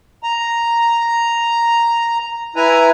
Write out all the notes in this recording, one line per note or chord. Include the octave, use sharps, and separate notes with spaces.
A#5
E4 B4 G#5 A#5